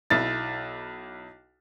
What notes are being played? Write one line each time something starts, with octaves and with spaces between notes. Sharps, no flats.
B1 E4 A6